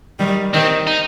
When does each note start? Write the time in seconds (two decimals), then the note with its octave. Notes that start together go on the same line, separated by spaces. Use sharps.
0.19 D#3 G3
0.54 D#3 C4
0.87 D#4